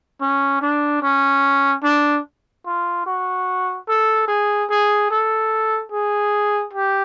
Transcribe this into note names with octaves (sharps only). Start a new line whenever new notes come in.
C#4
D4
C#4
D4
F4
F#4
A4
G#4
G#4
A4
G#4
G4